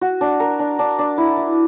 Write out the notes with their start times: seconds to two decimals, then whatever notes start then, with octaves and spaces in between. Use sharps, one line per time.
0.01 F#4
0.21 D4
0.40 A#4
0.59 D4
0.79 D4
0.99 D4
1.18 E4
1.37 E4